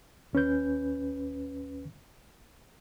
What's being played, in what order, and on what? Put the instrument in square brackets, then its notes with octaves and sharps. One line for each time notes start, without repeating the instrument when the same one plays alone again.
[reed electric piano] D#2 C#4 B4 G6